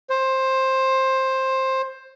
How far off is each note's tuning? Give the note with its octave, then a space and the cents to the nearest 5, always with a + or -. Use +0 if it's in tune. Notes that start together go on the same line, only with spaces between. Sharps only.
C5 +15